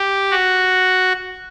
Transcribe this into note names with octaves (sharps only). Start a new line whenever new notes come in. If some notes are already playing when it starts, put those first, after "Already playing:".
Already playing: G4
F#4